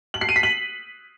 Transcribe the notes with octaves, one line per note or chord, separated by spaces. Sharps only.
F#7
C7
D#7
B6
F#7